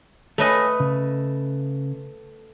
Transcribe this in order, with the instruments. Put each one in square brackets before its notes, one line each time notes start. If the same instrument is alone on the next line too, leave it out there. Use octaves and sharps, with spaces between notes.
[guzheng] A3 B4 D#5 [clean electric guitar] A4 C#5 G#5
[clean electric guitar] C#3